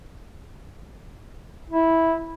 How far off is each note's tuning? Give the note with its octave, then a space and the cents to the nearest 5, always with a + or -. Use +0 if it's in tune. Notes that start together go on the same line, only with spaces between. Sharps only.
E4 -10